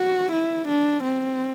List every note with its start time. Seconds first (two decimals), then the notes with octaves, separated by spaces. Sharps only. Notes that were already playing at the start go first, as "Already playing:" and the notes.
Already playing: F#4
0.33 E4
0.69 D4
1.04 C4